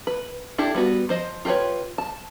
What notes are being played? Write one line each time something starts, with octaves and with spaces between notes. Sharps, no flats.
B4
D4 E4 G4 A4
G3 B3 F#4
F3 C5 D#5
F4 G4 A#4 B4 C#5
A5